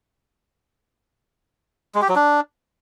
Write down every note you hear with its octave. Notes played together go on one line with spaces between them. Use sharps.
G#3
G4
F#3
D4